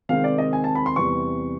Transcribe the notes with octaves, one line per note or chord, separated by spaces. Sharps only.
C3 D#3 G#3 C4 F5
D5
D#5
G#5
A5
B5
C6
E2 C3 E3 G3 C#6